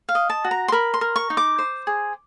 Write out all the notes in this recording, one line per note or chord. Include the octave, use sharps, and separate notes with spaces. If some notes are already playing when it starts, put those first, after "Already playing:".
F5
D#5
A5
F#4
A#5
C6
A#4 B5
C6
A#4
C#6
D#4
D6
C5
G#4